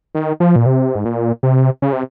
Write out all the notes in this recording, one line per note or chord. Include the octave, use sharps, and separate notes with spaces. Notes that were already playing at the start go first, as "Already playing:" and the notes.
D#3
F3
A#2
C3
G#2
A#2
C3
C#3
C3